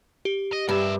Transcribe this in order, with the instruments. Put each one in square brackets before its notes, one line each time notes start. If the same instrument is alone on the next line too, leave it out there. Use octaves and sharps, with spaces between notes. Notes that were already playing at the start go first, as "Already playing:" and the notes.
[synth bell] G4
[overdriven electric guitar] D#5
[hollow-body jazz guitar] G2 [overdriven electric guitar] A#4 E5